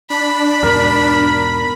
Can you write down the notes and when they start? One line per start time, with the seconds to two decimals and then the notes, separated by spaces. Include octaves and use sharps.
0.10 D4 B5
0.63 E2 G#2 B2 A#4